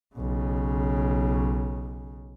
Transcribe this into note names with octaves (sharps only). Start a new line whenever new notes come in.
B1 C#3